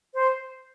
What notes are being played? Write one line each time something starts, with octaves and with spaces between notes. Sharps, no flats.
C5